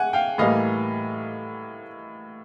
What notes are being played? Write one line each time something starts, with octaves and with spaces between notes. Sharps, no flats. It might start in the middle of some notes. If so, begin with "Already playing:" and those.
Already playing: F#5 G#5
F5 G5
A2 E3 G3 A#3 D#5 F5